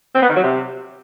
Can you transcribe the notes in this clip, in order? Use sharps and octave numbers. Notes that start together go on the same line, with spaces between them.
C4
B3
D#3
F#3
C3